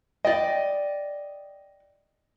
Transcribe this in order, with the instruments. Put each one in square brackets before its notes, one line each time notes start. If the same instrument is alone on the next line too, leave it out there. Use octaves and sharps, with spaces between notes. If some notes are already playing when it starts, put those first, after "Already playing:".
[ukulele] D5 G5 [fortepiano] D#5